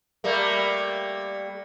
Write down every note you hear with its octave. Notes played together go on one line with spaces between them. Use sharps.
G3 A3 A#3